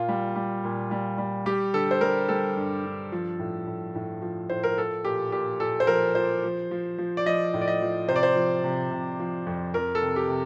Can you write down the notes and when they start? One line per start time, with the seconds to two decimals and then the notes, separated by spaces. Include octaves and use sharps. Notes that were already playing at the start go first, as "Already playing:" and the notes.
Already playing: A#2 F4
0.08 G3
0.36 G3
0.64 A#2
0.91 G3
1.18 G3
1.46 G3 G4
1.73 D3 A4
1.91 C5
2.01 G3 A#4
2.28 G3 A4
2.56 G2
2.85 G2
3.12 F3
3.39 A2
3.67 A2
3.95 A2
4.22 F3
4.50 A2 C5
4.63 A#4
4.78 F3 A4
5.04 A#2 G4
5.32 A#2 G4
5.60 A#2 A4
5.80 C5
5.87 F3 A#4
6.15 F3 C5
6.43 F3
6.71 F3
6.98 F3
7.17 D5
7.26 F3 D#5
7.54 A2
7.61 D5
7.68 D#5
7.82 F3
8.08 C3 C5
8.16 D5
8.23 C5
8.36 F3
8.64 C3
8.91 C3
9.19 F3
9.47 F2
9.74 F2 A#4
9.95 A4
10.02 C3
10.16 G4
10.29 C3